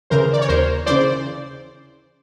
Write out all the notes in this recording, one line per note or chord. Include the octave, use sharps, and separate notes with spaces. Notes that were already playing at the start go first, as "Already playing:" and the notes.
C#3 E3 A#4 C5
D5
C#5
D#2 A#4 C5
C#3 E3 C5 D5